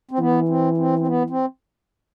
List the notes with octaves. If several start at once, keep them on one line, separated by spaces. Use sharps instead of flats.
C4
E3 B3
C4
C4
C4
B3
C4